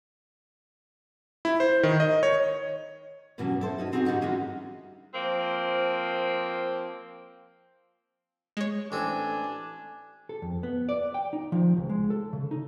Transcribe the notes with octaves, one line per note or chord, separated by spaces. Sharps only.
E4
C5
D#3
D#5
C#5
G2 B2 E3 F#3 A#3 C#4
E4 A4 C5
C#4 D#4 F#4
B3 C4 D#4 F#4 G#4 A#4
G2 D3 G3 D#4 F#4
E3 G#3 C#4 D#4 F4 F#4
F3 A#3 C4
G#3 C#5
A1 C4 D4 G#5
A4
F2
B3
D5
G5
D#4
F3
C#2
G#3
A4
C#3
D#4